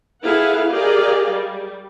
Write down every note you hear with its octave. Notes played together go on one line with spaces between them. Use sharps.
E4 G#4 A4 B4 F5 F#5
G4 G#4 A#4 D5 D#5 F5
G3